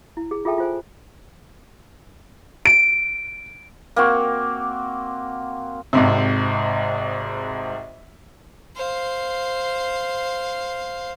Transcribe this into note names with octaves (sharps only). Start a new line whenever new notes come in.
E4
G#4
F4 G#4 A4 E5 G5 A5
F4 C5 G#5
D7
A#3 C4 F#4
G#1 G#2 C3
C5 F5